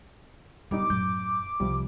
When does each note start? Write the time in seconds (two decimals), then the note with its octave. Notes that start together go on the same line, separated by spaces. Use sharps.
0.71 F#2 C#3 G3 B3 D#4 D6
0.90 F#2 A2 G6
1.60 C2 C3 F3 G3